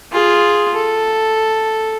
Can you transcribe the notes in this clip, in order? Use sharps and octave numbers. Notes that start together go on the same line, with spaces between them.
F4 G#4
A4